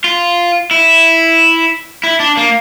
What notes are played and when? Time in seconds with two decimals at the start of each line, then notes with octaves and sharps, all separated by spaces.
0.04 F4
0.71 E4
2.03 E4
2.20 D4
2.37 A#3